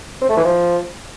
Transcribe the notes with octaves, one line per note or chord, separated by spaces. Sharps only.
C4
A3
E3
F3